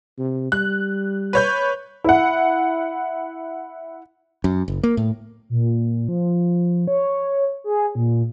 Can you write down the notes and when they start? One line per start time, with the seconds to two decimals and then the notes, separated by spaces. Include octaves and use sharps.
0.18 C3
0.52 G3 F#6
1.33 B4 C#5 G6
2.04 E4 F#5
4.44 F#2
4.68 F#1
4.83 A#3
4.97 A2
5.49 A#2
6.08 F3
6.88 C#5
7.64 G#4
7.95 A#2